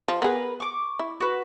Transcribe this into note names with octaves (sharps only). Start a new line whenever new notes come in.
F3
B3 G#4 A#4 B4
C#6 D6
E4
F#4 B4